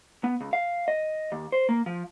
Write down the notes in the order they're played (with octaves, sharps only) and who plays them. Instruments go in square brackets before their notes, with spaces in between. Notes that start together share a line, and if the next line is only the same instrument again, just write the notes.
[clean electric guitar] B3
C#2
F5
D#5
D#2
C5
A#3
F3